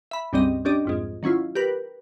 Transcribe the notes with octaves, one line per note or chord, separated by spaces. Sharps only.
E5 B5
C#2 G2 G3 C4 D#5
C#4 D4 G4 D5 D#5
C2 F2 G#2
D#3 F#3 C#4 E4 F4
G4 A#4 B4